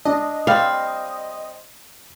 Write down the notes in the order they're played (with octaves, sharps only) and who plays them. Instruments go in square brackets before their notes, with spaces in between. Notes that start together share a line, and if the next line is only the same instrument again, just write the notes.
[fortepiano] D4 [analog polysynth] D#5
[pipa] G3 C4 [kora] F5